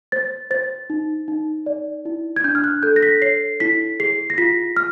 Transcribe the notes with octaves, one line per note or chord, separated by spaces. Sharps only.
C5 A6
C5 A6
D#4
D#4
D5
E4
G#6
D4 G6
F6
F#6
A4 G6
A#6
B6
C#5 C7
E4 B6
G#4 C7
A#6
F4 B6
F6